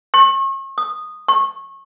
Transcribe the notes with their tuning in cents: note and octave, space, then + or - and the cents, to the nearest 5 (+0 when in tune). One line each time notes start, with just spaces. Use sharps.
C#6 -40
D#6 -10
C#6 -30